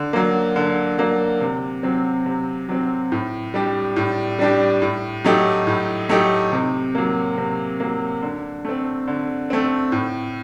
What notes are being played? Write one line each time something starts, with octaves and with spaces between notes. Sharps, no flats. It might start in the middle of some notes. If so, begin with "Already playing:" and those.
Already playing: D3
F#3 A#3
D3
F#3 A#3
C3
F#3 C4
C3
F#3 C4
A2
G3 D4 G4
A2
G3 D4 G4
A2
F#3 A3 D#4 G4
A2
F#3 A3 D#4 G4
C3
F#3 A#3
C3
F#3 A#3
D3
A3 C4
D3
A3 C4
A2